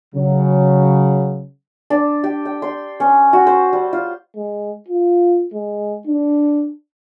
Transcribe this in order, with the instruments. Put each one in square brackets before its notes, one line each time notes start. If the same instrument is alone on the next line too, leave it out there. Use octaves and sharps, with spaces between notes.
[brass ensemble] C#3 F#3
[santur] D4
G4
G5
C6
C#4
F#4
C5
G3
F4
[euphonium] G#3
F4
G#3
D4